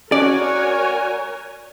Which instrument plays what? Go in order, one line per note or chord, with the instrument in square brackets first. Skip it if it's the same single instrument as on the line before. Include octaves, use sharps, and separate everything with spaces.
[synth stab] C#4 D4 [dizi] F#4 [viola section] A#4 C#5 G#5 [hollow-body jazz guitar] D5